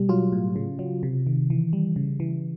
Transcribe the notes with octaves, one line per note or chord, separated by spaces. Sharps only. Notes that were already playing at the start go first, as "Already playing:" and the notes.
Already playing: B2 G3
F#3 F4
A2
C#3
F#3
C3
D#3
E3
G3
C#3
E3